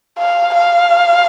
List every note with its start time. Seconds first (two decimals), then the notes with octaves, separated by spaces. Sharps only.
0.18 F5
0.54 F5